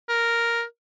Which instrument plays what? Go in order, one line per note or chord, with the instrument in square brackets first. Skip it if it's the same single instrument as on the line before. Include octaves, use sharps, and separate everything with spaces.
[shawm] A#4